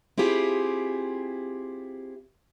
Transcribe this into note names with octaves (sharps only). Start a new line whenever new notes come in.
C4 E4 F4 G4 G#4